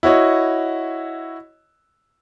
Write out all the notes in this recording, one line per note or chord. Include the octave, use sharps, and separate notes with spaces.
E4 F#4 C#5 D#5